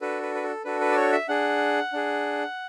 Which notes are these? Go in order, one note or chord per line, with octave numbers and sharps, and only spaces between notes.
D4 F#4 A4 B4
B4
B4
A4
D4 F#4 A4 B4
B4
D5
C#5
E5
D4 G#4 F#5
D4 G#4